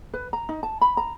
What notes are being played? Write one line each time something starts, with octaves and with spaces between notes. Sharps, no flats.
B4
A#5
D#4
A5
B5
A#5